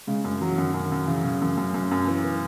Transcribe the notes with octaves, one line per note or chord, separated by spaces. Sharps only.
C#3 G#3
F#2
E3 F#3
E3
F#2
D#3
F#2
F#2
C#3 E3
C#3 F#3
F#2 E3
F#2 F#3
F#2
F#2
E3
E3